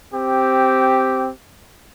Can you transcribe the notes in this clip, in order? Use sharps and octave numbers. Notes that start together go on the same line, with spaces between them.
C4 G4